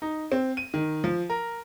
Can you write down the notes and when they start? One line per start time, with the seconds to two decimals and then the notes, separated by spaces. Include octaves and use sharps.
0.02 D#4
0.32 C4
0.57 D#7
0.74 D#3
1.04 F3
1.30 A#4